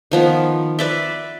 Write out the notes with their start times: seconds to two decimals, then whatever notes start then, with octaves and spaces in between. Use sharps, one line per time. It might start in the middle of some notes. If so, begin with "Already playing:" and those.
0.12 D#3 F3 B3
0.79 B4 D5 E5